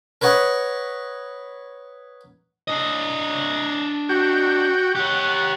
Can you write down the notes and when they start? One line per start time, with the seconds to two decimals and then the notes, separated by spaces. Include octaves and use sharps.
0.21 A#4 B4 C#5 D#5 F#5
2.68 D4 D#5
4.09 F#4 G5
4.95 G4 C#5 F#5